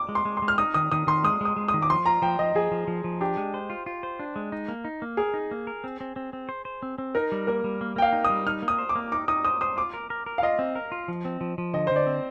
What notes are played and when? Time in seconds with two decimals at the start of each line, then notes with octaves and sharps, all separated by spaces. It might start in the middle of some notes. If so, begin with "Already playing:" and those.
Already playing: D6
0.09 G#3
0.15 C6
0.25 G#3
0.37 C6
0.42 G#3
0.48 F6
0.58 D#4 D#6
0.74 D#3 D#6
0.92 D#3 D#6
1.07 D#3 C6
1.24 G#3 D#6
1.41 G#3 D#6
1.56 G#3
1.68 D#6
1.74 D#3
1.82 D6
1.90 F3 C6
2.06 F4 A#5
2.22 F3 G5
2.39 F3 D#5
2.55 F3 G#4
2.71 F3
2.88 F3
3.04 F3
3.21 D4 G4
3.37 G#3
3.54 C5
3.70 F4
3.86 F4
4.03 C5
4.19 D4
4.36 G#3
4.52 D#4
4.68 A#3
4.85 D#4
5.02 A#3
5.17 G#4 A#4
5.34 D#4
5.51 A#3
5.67 A#4
5.84 C4
6.00 C4
6.16 C4
6.33 C4
6.49 C5
6.65 C5
6.83 C4
6.98 C4
7.15 D#4 A#4
7.32 G3
7.47 A#3 A#4
7.64 G3
7.81 A#3
7.96 A#3 G5
8.02 F5
8.13 D#4
8.25 D#6
8.30 G3
8.47 D#4 F6
8.62 A#3
8.68 D#6
8.78 C5
8.89 D6
8.95 A#3
9.12 D#4 D6
9.28 D#4 D#6
9.45 C5 D#6
9.61 C5 D#6
9.77 F4 D6
9.94 A#4
10.10 A#4
10.26 A#4
10.38 F5
10.43 F4 D#5
10.59 C4
10.75 A#4
10.92 F4
11.08 F3
11.25 C4
11.41 F3
11.58 F3
11.74 D3 D#5
11.87 C5
11.91 D3 D5
12.07 C4